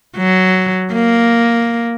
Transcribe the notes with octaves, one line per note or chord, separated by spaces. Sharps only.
F#3
A#3